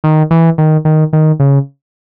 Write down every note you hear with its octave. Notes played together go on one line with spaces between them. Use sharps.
D#3
E3
D#3
D#3
D#3
C#3